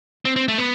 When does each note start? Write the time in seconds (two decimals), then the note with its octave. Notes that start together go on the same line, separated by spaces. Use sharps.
0.25 C4
0.36 C4
0.48 A3
0.58 B3